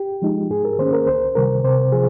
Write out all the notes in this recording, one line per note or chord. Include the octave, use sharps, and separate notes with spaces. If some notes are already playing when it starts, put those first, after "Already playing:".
Already playing: G4
F3 G#3 D#4
G#2 G#4
A#4
D#3 A#3 C#4 C5
A#4
C#2 C5
C3 D#3 G3 A#4
C3 C5
F3 G#4